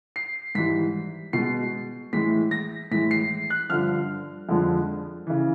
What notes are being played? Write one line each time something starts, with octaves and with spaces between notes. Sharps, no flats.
C7
G#2 E3 G3 B6
B2 G#3 C7
A2 E3 G#3 B6
A#6
A2 E3 G#3 B6
C7
F#6
G2 D3 F3 F6
F2 D3 F3 G#3
C#3 E3